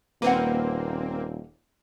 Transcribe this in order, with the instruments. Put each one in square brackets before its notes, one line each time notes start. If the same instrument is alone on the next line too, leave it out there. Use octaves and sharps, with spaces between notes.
[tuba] D#1 [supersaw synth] A#3 C4 [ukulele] B4 F#5